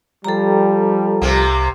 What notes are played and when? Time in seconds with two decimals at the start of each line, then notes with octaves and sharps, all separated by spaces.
0.24 F3 G3 A4 A#5
1.22 C2 C3 A#3